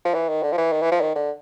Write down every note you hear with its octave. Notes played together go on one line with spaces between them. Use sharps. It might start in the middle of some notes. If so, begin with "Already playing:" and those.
F3
E3
D#3
D3
F3
E3
D#3
E3
F3
D#3
D3